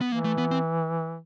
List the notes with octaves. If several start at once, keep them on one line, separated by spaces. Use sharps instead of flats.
B3
E3 A#3
A3
B3
C4